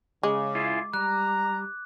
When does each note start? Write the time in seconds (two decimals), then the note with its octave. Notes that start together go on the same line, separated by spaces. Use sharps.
0.23 C#3 G#3 D6
0.55 E4 F4 G#4
0.94 G3 A#5 F#6